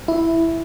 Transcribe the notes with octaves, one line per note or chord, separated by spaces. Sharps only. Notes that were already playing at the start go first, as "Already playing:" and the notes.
E4